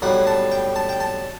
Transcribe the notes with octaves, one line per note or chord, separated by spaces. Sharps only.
B1 A2 G3 F#5
A5
G5
A5
G5
A5